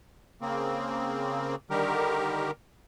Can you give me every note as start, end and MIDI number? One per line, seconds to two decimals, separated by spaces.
0.41 1.55 49
0.41 1.55 58
0.41 1.55 60
1.70 2.51 50
1.70 2.51 51
1.70 2.51 55
1.70 2.51 67
1.70 2.51 70